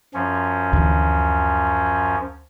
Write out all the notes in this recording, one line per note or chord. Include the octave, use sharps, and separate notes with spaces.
F#2 F3 C#4
D2 E3